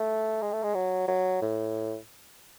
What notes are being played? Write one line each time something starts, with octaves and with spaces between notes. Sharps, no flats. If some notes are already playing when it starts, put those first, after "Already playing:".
Already playing: A3
G#3
A3
G#3
F#3
F#3
A2